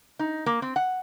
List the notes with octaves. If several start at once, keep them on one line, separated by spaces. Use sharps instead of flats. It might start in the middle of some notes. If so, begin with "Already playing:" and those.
D#4
A#3
C4
F#5